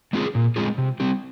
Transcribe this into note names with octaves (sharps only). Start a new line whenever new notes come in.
G#3 C4 F4 G#4
A#2
G#3 C4 F4 G#4
C3
G3 C4 G4